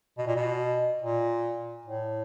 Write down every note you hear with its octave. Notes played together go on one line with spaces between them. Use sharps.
B2
A#2
B2
A#2
A2